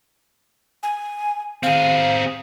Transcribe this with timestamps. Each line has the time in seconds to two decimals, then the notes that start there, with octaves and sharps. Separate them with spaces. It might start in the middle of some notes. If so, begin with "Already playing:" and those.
0.83 G#5
1.63 C4 G#4 F5